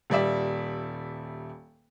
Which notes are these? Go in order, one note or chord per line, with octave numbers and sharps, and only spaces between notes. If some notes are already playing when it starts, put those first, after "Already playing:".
D#1 G3 D5 E5